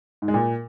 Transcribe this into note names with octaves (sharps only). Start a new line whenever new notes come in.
G#2
G#3
A#2